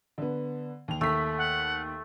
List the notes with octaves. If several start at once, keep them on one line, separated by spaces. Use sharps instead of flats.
D3 B3
D#2 F7
D#2 A3 B6
F#5